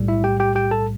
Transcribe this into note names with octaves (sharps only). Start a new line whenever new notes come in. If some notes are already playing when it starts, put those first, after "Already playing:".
Already playing: B1 A2 G3
E4 E5
G4 G5
G4 G5
G4 G5
A4 A5